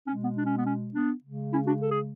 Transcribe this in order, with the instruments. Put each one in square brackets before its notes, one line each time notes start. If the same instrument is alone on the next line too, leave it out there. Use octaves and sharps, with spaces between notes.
[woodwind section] B2 G#3 C#4
B3
D4
C#4
B3
C#4
B3 D4
C#3 G#3
C#4 E4
D4 F#4
A4
G#4